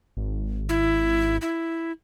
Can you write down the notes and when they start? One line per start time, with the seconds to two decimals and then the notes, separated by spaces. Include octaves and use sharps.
0.17 G#1
0.69 E4
1.41 E4